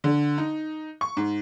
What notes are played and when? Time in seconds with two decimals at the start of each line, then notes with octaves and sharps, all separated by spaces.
0.04 D3
0.38 D#4
1.01 C#6
1.17 G#2